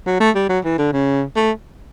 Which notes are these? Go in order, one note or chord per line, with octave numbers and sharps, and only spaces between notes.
F#3
A3
G3
F#3
E3
D3
C#3
A3